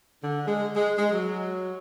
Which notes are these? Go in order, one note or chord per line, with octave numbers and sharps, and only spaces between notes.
D3
G#3
G#3
G#3
F#3